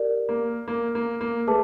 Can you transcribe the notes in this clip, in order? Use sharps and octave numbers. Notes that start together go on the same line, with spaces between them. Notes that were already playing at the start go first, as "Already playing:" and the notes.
Already playing: G4 A#4 D5
A#3
A#3
A#3
A#3
A3 G#4 B4 E5 A5 D6